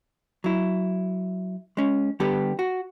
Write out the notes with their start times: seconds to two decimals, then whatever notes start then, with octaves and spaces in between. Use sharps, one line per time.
0.44 F#3 E4
1.77 G#3 C#4
2.20 D3 G3 B3 G4 A4
2.59 F#4